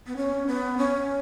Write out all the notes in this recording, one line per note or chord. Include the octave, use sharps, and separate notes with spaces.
B3
C#4
B3
C#4